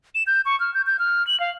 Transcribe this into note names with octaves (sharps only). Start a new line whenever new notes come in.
E7
G6
C#6
F6
G6
G6
F6
F#7
F5